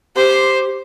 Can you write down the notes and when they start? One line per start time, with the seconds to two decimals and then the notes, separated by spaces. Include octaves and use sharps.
0.16 G4 C5